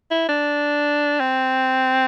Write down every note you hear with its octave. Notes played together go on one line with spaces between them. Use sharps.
E4
D4
C4